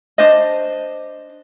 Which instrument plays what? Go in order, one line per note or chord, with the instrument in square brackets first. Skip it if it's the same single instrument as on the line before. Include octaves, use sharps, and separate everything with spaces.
[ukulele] D4 C5 D#5